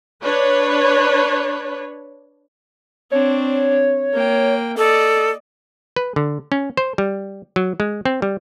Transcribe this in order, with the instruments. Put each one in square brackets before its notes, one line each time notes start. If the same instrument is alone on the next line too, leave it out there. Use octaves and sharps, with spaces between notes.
[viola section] D4 B4 C#5
[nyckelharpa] C4 D4 [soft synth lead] C#5
[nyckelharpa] A#3 G5
[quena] A4 [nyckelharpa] D5 D#5
[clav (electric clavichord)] B4
D3
C#4
C5
G3
F#3
G#3
C4
G3